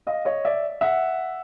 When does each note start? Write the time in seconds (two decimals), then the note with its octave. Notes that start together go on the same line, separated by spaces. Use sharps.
0.07 D#5 F5
0.25 C#5 D#5
0.45 D5 E5
0.81 E5 F#5